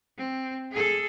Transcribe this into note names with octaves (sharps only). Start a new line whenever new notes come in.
C4
G#4 A4